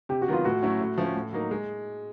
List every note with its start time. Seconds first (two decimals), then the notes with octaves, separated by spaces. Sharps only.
0.09 C3 G4
0.22 F#4
0.28 D#3 F#3 B3 F4
0.45 A2 F#4
0.62 F#3 A3 C#4 E4
0.80 A2
0.98 F3 A3 C#4
1.15 A2
1.33 F#3 A#3 D#4
1.51 G#3